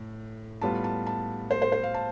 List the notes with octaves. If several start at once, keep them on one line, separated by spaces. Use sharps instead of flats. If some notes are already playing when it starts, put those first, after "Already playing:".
Already playing: A2
A2 G3 B3 F4 A5
A5
A5
C5
C5
C5
F5
A5